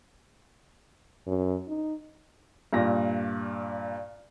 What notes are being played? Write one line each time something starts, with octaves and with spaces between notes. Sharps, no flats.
F#2
D#4
G2 A#2 A#6